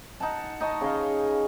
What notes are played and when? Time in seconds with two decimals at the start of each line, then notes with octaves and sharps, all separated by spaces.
0.20 D#4 F#5 A5
0.60 D#4 D#5 A5 C#6
0.81 C#3 G#4 D#5 F5